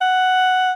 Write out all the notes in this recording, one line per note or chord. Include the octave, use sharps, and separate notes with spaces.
F#5